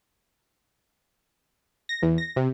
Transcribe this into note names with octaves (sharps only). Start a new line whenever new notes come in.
A#6
E2
A#6
C3